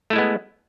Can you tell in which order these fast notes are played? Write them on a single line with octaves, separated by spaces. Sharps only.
A3 E4 G#3 B3